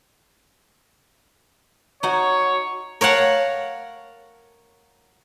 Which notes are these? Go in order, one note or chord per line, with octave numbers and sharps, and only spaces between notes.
D#4 F#4 C#5
A#4 C#5 F5 F#5 A5